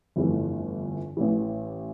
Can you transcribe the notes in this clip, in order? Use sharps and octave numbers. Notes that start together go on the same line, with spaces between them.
G1 F2 E3 A3
A1 A2 E3